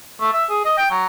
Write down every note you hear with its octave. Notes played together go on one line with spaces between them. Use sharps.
A3
E5
G#4
D#5
G5
F#3